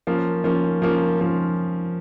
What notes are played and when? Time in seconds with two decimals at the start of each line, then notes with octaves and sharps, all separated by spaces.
0.07 F3 A#3 C#4
0.44 F3 A#3 C#4
0.82 F3 A#3 C#4
1.19 F3 A#3 C#4